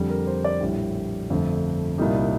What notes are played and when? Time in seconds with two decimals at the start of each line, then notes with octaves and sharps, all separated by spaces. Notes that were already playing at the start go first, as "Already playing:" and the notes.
Already playing: F2 D3 G3
0.10 A#4
0.27 C5
0.45 D5
0.60 A#1 A2 G3
1.30 G1 F2 D3 A3
1.98 C2 A#2 G3 D#4